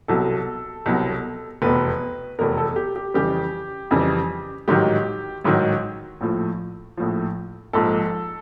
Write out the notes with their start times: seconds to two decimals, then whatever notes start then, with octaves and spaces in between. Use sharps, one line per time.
0.08 C2 B2 F#3 A4
0.86 C2 B2 F#3
1.62 F1 E2 B2 B4
2.39 F1 E2 B2 A#4
2.57 A4
2.76 G4
2.96 G4
3.14 F2 C#3 E3 G3 G4
3.91 F2 C#3 E3 G3
4.68 A1 G#2 D#3 F#3 G4
5.44 A1 G#2 D#3 F#3
6.21 A#1 A2 F3
6.97 A#1 A2 F3
7.73 A#1 G#2 F3 A4